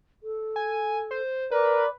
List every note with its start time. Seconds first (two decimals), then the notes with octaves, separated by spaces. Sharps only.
0.23 A4
0.56 G#5
1.11 C5
1.51 A#4 B4 D5